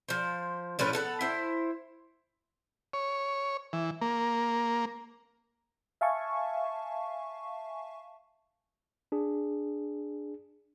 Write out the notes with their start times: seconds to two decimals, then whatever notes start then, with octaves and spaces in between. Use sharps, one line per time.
0.09 F3 C5
0.79 A2 F3 C#4 B4
0.93 B3 A4 F#5
1.21 E4 C5
2.93 C#5
3.73 E3
4.01 A#3
6.01 E5 F5 G#5 A5 C#6
9.12 D4 G#4